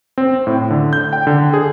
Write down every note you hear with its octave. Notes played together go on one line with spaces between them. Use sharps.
C4
A2
D3
G6
G5
D3
G#4